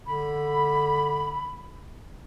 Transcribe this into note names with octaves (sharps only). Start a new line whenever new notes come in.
D3 B5